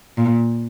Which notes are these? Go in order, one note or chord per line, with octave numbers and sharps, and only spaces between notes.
A#2